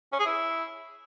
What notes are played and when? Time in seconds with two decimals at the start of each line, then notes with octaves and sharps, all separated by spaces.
0.13 C#4
0.19 G#4
0.26 E4